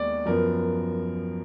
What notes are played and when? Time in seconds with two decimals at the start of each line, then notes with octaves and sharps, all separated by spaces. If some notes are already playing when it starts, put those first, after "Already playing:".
Already playing: D#2 G#3 B3 D5
0.26 F#2 F3 B3 A#4